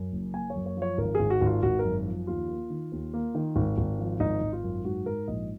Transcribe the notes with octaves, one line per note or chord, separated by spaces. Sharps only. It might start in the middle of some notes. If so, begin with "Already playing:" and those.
Already playing: F#2
F#1
A#3 G#5
C#5
F#2
C#5
F3
C#5
G#1 A#4
G#1 G#4
F#4
G#1 F4
G#1 F#4
A#4
F#2
F3
D#2 F4
A#3
D#3
D#2
A#3
D#3
G#1
G#1
F3
G#1 D#4
G#1
F4
F#2
G#2 F#4
G#2 A#4
A#1 D#5